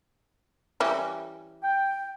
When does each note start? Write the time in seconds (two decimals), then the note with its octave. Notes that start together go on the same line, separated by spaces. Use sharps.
0.80 E3 G3 C#4
1.63 G5